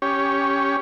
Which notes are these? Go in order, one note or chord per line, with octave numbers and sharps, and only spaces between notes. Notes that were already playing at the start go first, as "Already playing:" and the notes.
C#4 G4 C#5